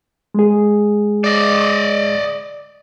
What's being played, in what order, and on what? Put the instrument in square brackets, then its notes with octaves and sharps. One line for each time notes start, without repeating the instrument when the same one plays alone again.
[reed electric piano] G#3 G#4
[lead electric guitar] D5 D#5